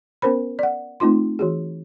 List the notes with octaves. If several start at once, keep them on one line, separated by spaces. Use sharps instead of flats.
B3 C#4 A#4 C5 B5
D5 F#5
A3 C4 D#4 F4 C6
E3 F#4 G#4